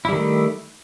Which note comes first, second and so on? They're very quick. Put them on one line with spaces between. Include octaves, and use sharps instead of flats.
E4 G3 D#3 A3